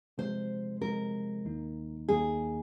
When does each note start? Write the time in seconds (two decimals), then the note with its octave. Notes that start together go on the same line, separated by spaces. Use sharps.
0.18 C3 F3 G#3 C5
0.81 C3 F3 G#3 A#4
1.45 D#2 D#3 A#3 D#4
2.08 D#2 D#3 A#3 D#4 G#4